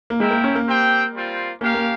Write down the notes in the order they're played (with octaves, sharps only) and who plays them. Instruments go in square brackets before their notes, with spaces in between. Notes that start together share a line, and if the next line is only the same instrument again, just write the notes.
[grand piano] A#3
[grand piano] G#3 [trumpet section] C4 E4 A#4 E5 G5
[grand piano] A#3
C#4
A#3
[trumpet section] C4 G4 C5 G5
G3 C4 F4
[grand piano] A#3 [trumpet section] C#4 G4 A#4 F5
[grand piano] A#3